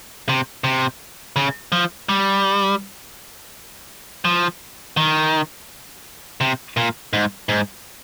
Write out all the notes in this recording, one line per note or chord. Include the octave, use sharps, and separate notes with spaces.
C3
C3
C#3
F3
G3
F3
D#3
C3
A#2
G#2
G#2